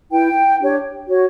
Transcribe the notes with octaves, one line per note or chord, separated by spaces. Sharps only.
E4 B4 G5
D4 G4 C#5
F#4 C#5